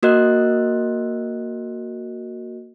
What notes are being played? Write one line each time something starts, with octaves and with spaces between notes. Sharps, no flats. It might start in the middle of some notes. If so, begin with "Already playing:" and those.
A#3 F#4 A#4 D#5 F#6